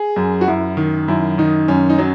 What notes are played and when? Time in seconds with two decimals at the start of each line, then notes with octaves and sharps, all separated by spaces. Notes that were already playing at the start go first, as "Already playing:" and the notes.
Already playing: G#4
0.16 F#2
0.41 F#4
0.48 F#2 E4
0.77 D#3
1.08 F#2 E4
1.38 D#3 D#4
1.68 F#2 C#4
1.90 D#4
1.98 F#3 C#4